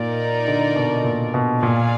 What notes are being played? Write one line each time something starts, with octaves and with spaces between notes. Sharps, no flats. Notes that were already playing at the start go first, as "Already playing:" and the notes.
Already playing: A#2 D#4 A#4 D5
D3
B2
A#2
B2
A#2 F4 G#4 D5 F5 G#5